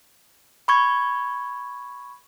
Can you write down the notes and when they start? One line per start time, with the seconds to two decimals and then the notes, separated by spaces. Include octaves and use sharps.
0.68 B5 C#6 G#6